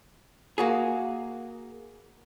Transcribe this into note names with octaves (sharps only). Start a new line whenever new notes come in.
A#3 F#4 G#4